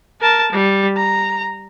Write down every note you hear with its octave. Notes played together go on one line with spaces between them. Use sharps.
A#4 A5
G3
A#5